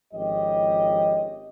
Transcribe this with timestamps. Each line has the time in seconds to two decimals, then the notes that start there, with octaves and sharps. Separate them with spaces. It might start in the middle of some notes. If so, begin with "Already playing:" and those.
0.13 G#1 F3 C#4 G4 D#5